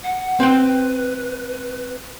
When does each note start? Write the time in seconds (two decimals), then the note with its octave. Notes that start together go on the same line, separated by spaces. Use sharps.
0.03 F#5
0.40 C4 B4 G5